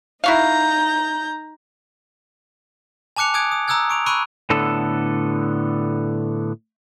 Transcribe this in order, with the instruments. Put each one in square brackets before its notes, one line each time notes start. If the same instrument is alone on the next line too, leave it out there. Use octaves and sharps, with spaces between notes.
[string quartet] D#4 A#5 G6 [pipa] E4 F#4 F5
[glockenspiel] G#5 A5 D6 F#6 C#7 F7
G#5 D6 D#6 F#6 G#6 D7
D#6
A#5 D#6 E6 F#6 G#6
C#6 D7 F7
B5 C#6 E6 F#6 D7 D#7
[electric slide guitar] A2 D3 B3 A4